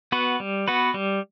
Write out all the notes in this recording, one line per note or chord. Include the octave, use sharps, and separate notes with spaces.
B3 F#4 B4
G3
B3 F#4 B4
G3